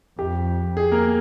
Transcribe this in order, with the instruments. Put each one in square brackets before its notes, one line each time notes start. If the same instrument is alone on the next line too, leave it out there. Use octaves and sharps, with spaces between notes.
[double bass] F2 [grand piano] G4
[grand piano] G#4
A#3 A#4